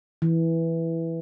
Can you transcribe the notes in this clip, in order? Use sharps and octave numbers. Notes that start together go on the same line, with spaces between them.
E3